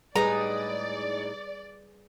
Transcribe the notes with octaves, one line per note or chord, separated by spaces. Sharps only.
A2 G3 G#3 D#4 G#4 B4 D5 A#5